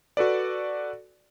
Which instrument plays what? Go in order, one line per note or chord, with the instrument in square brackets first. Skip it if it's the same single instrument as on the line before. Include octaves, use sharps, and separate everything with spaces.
[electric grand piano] F#4 A4 B4 D5